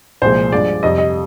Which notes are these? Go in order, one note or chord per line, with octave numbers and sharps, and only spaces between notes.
C2 A#2 F3 G#3 C5
G2 F3 G#3 D5
F2 C3 G3 D#5
D#5